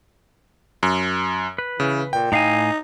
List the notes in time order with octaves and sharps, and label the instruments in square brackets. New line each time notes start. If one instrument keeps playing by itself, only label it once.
[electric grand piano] F#2
[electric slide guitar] B4
[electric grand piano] C#3 [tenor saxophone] E3
[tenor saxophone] A#2 [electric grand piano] G5
[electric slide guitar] A2 F5 G#5 [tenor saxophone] D#4